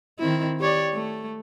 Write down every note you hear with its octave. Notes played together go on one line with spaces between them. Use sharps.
D#3 C4 E4
G4 C#5 D5
A3